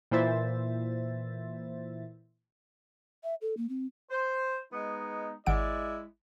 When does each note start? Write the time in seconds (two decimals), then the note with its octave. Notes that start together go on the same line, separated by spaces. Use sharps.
0.11 A#2 E3 E4 C5 E5 A6
3.23 E5
3.42 A4
3.57 A#3
3.69 C4
4.10 C5
4.72 G#3 B3 D#4
5.46 G#1 G#3 E4 D5 F#5 D7